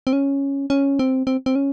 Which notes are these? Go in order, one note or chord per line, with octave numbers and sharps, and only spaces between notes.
C4
C#4
C#4
C4
C4
C4
C#4